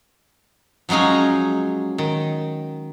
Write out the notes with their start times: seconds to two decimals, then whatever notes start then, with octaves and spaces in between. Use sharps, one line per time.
0.89 F3 F#3 G#3 C#4 D#4
1.98 D#3